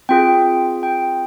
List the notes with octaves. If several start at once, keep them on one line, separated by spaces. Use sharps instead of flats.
C4 F4 G#4 G5
G5